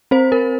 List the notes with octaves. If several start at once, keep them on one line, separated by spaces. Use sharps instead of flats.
C4 C5
A#4